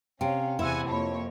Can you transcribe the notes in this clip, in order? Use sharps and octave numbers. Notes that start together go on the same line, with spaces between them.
C3 C#4 C#5 F5 G5
E2 C3 E4 F#5 G#5 B5 C6 E6
F2 A#3 C4 C#5 A5 B5